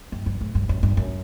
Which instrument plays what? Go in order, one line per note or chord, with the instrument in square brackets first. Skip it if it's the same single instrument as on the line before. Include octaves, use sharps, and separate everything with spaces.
[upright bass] G2
G2
G#2
G2
F#2
G2
F#2